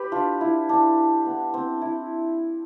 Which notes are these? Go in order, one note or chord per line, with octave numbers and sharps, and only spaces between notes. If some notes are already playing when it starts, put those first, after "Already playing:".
Already playing: G4 B4
D4 F4
E4
D4
B3
C4
E4